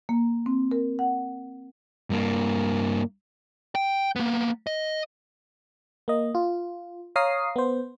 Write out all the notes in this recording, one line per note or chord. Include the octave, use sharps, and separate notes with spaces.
A#3
C4
A#4
F#5
G2 A#3
G5
A#3 B3
D#5
A#3 D#5
F4
C#5 F5 A#5 D#6 C7
B3 C5